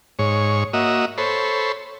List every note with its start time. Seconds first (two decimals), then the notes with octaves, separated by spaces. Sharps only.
0.19 G#2 C#5
0.73 A#3 F#4 D#5 E5
1.18 A4 C5 C#5 B5